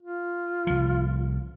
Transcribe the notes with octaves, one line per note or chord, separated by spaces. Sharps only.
F4
C2 F3